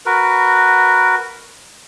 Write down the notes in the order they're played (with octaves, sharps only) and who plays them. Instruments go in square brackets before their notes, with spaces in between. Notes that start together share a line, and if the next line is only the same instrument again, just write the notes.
[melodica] F#4 A#4 B4